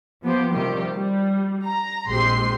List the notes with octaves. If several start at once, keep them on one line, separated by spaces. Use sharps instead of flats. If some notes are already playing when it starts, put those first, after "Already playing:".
F3 B3 G4 C5
C3 D#3 F3 G3 G4
G3
A#5
A#1 G#3 C4 G4 C6 C7